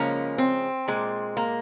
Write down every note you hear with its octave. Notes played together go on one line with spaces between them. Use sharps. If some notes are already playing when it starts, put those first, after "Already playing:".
Already playing: C#3 F3 G#3 A#3 C#4
C4
A#2 G#3
A#3